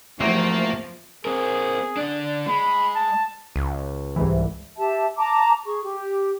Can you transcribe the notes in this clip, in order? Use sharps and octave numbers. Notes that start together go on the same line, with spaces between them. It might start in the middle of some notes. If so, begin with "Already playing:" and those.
E2 G#2 C3 F3 F#3 A3 A#3 C4
C4 G#4 A#4
D3 D4
G#3 B5
A5
C#2
C2 G#2 E3
G4 E5 A5
A5 A#5 D6
G#4 C#6
G4